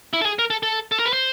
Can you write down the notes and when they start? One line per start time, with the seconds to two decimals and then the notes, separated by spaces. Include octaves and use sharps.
0.13 E4
0.21 A4
0.25 G#4
0.39 A#4
0.50 A4
0.63 A4
0.92 A4
0.99 A#4
1.06 B4
1.13 C5